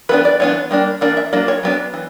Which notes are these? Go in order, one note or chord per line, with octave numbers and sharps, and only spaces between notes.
E3 B3 D4 B4
D5
E3 B3 D4 C#5
G3 A#3 D4
E3 A#3 D4 D5
E5
F#3 A#3 D4 D5
C#5
F#3 B3 D4
E3